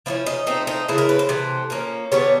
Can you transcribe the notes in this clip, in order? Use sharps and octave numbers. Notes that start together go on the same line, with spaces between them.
F3 A#3 C#4 E4
D#4
F3 A3 C4 D#4
D#4
C#3 E3 A3 E4
A#4
B4
C5
C3 E3 A3
F3 A#3 C#4
D#3 G3 B3 D4 C#5